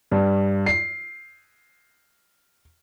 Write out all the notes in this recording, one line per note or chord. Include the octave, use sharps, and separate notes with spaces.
G2
C7